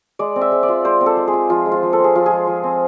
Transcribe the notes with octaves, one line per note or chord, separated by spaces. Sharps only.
G#3 D5
C4
E5
G#3
D5
F4
G#3 C5
C4
A4
G#3
G#4
F4
F3 F4
G#3
F4
F3
A4
C4
G#4
F3 F4
G#4
G#3
F3
C4